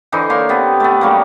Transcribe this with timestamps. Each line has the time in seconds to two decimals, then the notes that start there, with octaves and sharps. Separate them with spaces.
0.12 D3 E3 D#4 C5
0.30 A#3 C#5 C6
0.49 C3 B3
0.80 A3 B3
1.01 C#3 F#3 G3 A#3